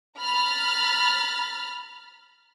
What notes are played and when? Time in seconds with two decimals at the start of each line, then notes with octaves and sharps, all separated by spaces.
0.19 A#5 B5 F6 A6